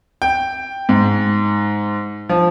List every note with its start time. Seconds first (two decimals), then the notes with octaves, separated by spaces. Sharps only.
0.22 G5
0.89 G#2
2.29 F3